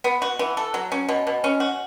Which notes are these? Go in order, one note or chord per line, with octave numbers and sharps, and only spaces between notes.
B3
F#4
E3
A4
F#3
C#4
B2
B2
C#4
F#4